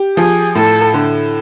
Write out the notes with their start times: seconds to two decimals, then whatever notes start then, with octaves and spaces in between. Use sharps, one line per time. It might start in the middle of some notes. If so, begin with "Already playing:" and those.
Already playing: G4
0.17 F3 G#4
0.55 A2 A4
0.94 D3